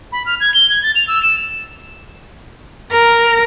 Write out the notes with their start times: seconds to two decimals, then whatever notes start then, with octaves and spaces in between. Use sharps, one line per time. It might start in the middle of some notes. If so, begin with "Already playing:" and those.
0.12 B5
0.26 F6
0.40 G#6
0.54 G7
0.70 G#6
0.83 A6
0.95 F7
1.08 E6
1.23 E7
2.92 A#4